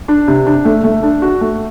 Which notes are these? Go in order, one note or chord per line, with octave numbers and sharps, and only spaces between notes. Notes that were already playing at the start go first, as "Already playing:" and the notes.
D4
C3
D4
A3
A3
D4
F#4
A3